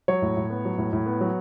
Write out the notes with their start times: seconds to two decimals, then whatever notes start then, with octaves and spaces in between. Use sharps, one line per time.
0.08 F#3 C#5
0.22 A2
0.37 A2
0.50 B3
0.65 F#3
0.78 A2
0.93 A2
1.06 B3
1.21 F#3